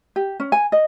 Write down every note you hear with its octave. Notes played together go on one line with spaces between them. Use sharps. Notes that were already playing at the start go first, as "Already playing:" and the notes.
G4
C#4
G#5
D#5